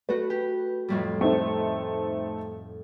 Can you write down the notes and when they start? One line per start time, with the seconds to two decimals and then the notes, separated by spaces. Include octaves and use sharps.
0.09 A3 F#4 B4
0.30 G4
0.88 F2 A2 G3
1.21 A3 C4 D#4